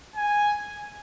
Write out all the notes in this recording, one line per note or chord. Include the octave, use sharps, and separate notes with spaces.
G#5